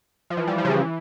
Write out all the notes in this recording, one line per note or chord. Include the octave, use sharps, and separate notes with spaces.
F3
E3
G3
F3
C#3
E3